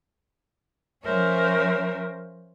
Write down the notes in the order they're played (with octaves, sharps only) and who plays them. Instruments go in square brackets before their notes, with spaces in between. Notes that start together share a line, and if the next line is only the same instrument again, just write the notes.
[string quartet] F3 C#4 A#4 C5 C#5 E5